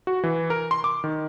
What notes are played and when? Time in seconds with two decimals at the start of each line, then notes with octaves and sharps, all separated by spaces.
0.07 F#4
0.23 E3
0.50 A#4
0.71 C6
0.84 D6
1.04 D#3